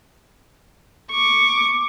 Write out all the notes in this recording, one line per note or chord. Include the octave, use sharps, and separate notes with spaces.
C#6 D6